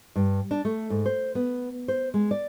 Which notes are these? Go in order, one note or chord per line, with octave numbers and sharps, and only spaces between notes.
G2
D4
A3
G#2
C5
B3
C5
G#3
D5